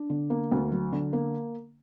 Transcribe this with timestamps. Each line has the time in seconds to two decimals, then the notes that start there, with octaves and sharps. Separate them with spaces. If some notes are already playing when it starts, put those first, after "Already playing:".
Already playing: D4
0.10 D3
0.30 A#3
0.51 D2
0.72 F#3
0.92 D3
1.13 A#3